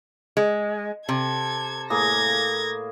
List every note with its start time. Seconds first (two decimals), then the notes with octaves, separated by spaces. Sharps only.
0.37 G#3
1.09 C3 A4 G#6
1.90 A2 A#3 G#4 G#6 A#6